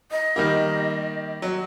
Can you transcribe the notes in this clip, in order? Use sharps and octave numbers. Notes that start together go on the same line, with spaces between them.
D#5
D#3 G3 A#3
F#3